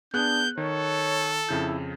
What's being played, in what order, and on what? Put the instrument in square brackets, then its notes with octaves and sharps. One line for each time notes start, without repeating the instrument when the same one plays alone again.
[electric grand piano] B3 G#4 F#6 [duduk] D4 [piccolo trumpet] G6
[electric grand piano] D#3 [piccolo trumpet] A4 [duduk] C#5
[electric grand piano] F2 C#3 G6 [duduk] E4